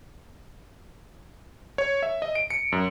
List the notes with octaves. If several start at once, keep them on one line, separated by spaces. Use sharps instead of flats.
C#5
E5
D#5
D7
C#7
F#2